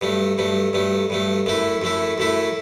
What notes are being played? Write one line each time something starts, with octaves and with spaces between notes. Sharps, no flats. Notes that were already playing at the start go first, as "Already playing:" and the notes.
G2 F#3 A3
G2 F#3 A3
G2 F#3 A3
G2 F#3 A3
F#2 F#3 A3 E4
F#2 F#3 A3 E4
F#2 F#3 A3 E4